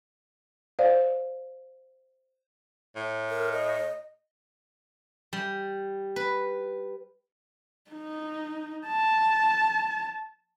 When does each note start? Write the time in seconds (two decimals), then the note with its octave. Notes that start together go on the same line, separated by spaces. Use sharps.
0.79 C5 D5 F5
2.96 A2
3.30 A#4
3.52 D#5
5.33 G3
6.16 B4
7.90 D#4
8.87 A5